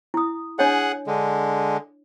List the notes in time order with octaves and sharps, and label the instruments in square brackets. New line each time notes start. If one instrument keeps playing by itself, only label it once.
[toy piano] E4 D#6
[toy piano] D4 C#5 D#5 [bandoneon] G#4 F#5
[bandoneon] D3 G#3